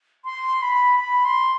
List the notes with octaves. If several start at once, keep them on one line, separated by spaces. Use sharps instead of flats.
C6
B5
B5
C6